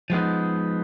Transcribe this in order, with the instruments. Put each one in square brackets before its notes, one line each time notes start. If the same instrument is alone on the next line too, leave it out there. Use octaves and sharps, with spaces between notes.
[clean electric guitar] F3 G#3 B3 D#4